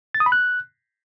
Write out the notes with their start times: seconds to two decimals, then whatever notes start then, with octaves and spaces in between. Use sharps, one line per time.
0.15 A6
0.20 D#6
0.26 B5
0.32 F#6